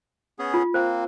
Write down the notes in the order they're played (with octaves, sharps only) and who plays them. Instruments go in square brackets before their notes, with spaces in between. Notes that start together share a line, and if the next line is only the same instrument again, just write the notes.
[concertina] B3 C#4 G#4
[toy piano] F4
[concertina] A#3 C4 [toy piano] C5